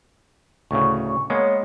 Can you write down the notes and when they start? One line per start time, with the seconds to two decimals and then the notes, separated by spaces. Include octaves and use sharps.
0.71 D2 A2 C#3 C#6
1.30 G#3 A#3 B3 C#5